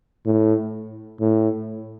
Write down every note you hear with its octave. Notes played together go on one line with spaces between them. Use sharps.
A2
A2